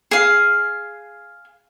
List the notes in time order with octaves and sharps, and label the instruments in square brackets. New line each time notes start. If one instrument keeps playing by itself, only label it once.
[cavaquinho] G#4 F5